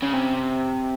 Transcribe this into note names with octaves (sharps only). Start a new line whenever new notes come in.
C#3
C3